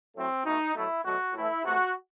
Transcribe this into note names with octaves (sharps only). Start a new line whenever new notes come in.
A2 F#3 A3 C4
B2 A3 D#4
B2 F#3 A3 E4
B2 F#3 A3 F#4
A2 E3 A3 E4
C3 E3 A3 F#4